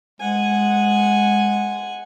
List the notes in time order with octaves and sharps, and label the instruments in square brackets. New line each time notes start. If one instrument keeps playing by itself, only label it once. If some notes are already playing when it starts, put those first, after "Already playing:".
[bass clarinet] G#3 [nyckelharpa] F#5 G#5